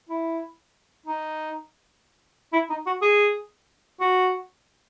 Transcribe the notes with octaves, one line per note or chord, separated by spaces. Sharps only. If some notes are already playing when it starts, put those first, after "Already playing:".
E4
D#4
E4
D#4
F#4
G#4
F#4